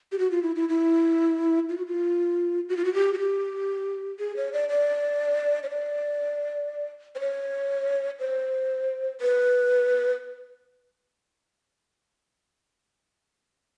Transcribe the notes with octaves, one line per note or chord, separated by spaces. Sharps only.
G4
F#4
F4
E4
E4
E4
F4
F#4
F4
F#4
F4
F#4
G4
F#4
G4
G#4
C#5
D5
D5
C#5
D5
C5
C#5
C5
B4